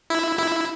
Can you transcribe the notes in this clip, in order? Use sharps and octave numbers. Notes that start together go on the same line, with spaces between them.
E4
E4